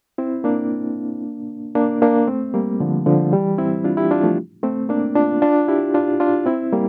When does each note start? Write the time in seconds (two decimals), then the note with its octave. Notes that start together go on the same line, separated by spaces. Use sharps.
0.18 C4 E4
0.44 A#3 D4
1.75 A#3 D4
2.02 A#3 D4
2.27 A3 C4
2.54 G3 A#3
2.80 D3 F3
3.06 D3 F3
3.32 E3 G3
3.58 C4 E4
3.85 D4 F4
3.97 E4 G4
4.11 D4 F4
4.23 F3 A3
4.63 A3 C4
4.89 A#3 D4
5.15 D4 F4
5.42 D4 F4
5.68 E4 G4
5.94 D4 F4
6.20 D4 F4
6.46 C4 E4
6.72 G3 A#3